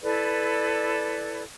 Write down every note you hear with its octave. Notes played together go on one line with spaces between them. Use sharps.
E4 A4 B4 D5